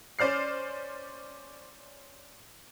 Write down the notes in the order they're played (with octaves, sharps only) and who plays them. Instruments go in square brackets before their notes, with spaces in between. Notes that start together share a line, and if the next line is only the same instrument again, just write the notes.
[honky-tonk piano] C#4 C5 D5 F6 C7